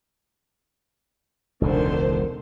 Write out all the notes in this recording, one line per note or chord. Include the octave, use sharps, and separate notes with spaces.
E1 C#2 D3 D#3 C5